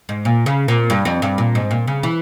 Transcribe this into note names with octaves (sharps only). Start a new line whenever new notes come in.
G#2
A#2
C#3
A#2
G2
F2
G2
A#2
G#2
A#2
C#3
E3